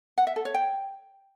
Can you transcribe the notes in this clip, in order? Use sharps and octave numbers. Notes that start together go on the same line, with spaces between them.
F#5
E5
A4
C#5
G5